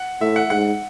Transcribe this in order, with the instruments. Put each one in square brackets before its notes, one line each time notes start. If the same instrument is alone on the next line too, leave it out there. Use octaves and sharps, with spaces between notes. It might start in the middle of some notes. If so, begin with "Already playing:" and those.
Already playing: [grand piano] F#5
[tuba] A2 [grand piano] E5
[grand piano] F#5
[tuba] G#2 [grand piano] F#5